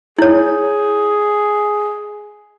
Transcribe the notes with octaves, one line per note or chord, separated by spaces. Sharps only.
E4 G#4 C#5